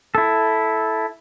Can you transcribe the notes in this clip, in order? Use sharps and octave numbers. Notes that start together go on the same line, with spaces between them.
E4 A4